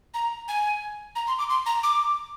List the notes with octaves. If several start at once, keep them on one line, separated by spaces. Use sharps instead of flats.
A#5
G#5
A#5
C6
D6
C6
A#5
D6